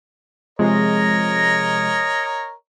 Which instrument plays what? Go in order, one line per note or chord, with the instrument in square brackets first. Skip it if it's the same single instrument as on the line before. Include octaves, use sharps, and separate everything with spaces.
[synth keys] C3 F3 G#3 [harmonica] A#4 C#5 D#5